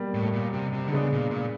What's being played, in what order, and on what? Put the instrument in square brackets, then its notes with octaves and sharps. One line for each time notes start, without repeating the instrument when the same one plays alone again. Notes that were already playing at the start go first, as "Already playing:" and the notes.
Already playing: [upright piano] B2 G3 A#3
[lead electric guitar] A2
A#2
C3
C3
D3
[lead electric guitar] C#3 [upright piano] G#3 B3 D4
[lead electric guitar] A#2
A#2